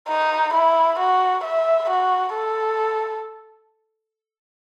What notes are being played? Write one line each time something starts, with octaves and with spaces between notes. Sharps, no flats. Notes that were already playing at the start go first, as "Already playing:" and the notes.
D#4
E4
F#4
E5
F#4
A4